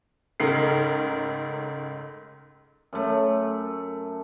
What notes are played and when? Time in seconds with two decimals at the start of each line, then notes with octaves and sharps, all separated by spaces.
0.40 C#2 G#2 A3 A#4 C7
2.93 F#2 A3